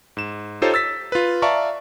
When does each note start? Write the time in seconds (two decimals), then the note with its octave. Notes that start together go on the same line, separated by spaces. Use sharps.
0.17 G#2 E7
0.62 D#4 F4 G4 A4 C5 C#5
0.74 E6 A6 B6
1.12 F4 B4
1.42 D5 E5 F5 A5 A#5 C#6